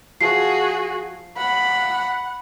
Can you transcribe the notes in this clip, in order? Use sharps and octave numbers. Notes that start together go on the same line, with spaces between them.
F3 F#4 G#4 C7
F#5 B5